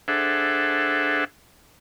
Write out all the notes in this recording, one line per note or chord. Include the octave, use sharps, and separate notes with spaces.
D4 G#4 A4 C5 E5 F#5